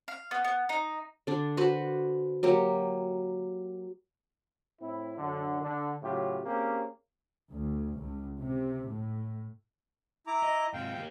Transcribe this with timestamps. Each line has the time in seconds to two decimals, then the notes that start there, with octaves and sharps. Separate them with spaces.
0.08 F5
0.31 B3
0.44 B3
0.69 D#4
1.27 D3 D4
1.57 F#4 B4 C5
2.43 F#3 A#3 G4
4.80 A2 C4 E4
5.17 F#2 D3
5.61 D3
6.01 A2 C#3 F#3 F4 G4
6.45 A#3 C4 C#4 G4 G#4
7.52 D2
7.99 C#2
8.41 C3
8.88 A2
10.27 E4 A#5 D6
10.43 D#5
10.73 G#2 C3 F5 G5
10.94 A#3 G4